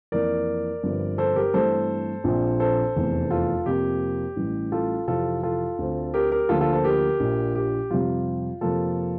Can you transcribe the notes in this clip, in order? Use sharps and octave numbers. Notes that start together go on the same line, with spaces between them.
F2 E3 A#3 A#4 D5
G1 G2 F3 C4
A4 C5
G4 A#4
G2 E3 A3 C4 A4 C5
A#1 A#2 F3 C4
A4 C5
F1 E2 E3 A3 C4
F4 A4
F2 C3 F3 A#3 G4
A1 A2 E3 G3
F4 A4
F2 C3 E3 F4 A4
F4 A4
D2 D3 A3 C4
G4 A#4
G4 A#4
D2 D3 F3 A#3 F4 A4
F4 A4
A4 C5
G4 A#4
A#1 A#2 F3
G4
F2 C3 G3 F4
F2 C3 F3 A#3 F4 A4